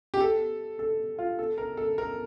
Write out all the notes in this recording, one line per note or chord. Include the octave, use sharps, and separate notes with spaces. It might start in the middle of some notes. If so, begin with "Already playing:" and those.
G4
A4
A4
F4
A4
A#4
A4
A#4